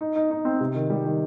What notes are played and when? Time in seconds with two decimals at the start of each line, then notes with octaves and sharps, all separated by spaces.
0.01 D#4
0.16 D#4
0.31 D#4
0.45 C4
0.61 C3
0.75 D#3
0.90 G3
1.05 D#3